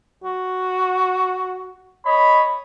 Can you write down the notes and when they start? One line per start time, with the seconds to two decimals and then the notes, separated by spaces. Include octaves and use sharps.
0.24 F#4
2.06 C#5 D#5 B5